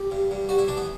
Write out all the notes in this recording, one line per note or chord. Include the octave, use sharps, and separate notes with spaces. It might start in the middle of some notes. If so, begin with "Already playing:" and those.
Already playing: G4
G2
G2
G3 F#4
E4
E3 D4
B3